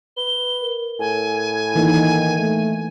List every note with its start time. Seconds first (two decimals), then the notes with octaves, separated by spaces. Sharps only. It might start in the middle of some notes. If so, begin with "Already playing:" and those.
0.17 B4 G7
0.63 A#4
0.99 A2 G#5
1.75 D#3 E3 A#3 D#4
2.39 A3